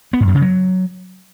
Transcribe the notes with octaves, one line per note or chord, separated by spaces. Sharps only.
B3
G#2
F#2
C#3
F#3